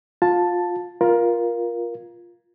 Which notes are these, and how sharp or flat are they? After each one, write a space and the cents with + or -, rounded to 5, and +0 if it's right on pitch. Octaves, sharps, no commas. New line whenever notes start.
F4 +15 A5 +0
F4 +0 A#4 +20